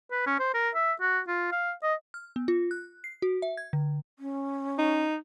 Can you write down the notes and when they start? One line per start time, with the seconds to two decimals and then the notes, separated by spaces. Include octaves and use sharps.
0.11 B4
0.27 C#4
0.39 C5
0.54 A#4
0.75 E5
1.01 F#4
1.28 F4
1.52 F5
1.83 D#5
2.14 F6
2.36 B3
2.48 F4
2.71 F#6
3.04 C7
3.22 F#4
3.42 E5
3.57 G#6
3.73 D3
4.19 C#4
4.79 D#4